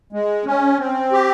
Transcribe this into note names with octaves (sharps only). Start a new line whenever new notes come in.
G#3
C#4
C4
G4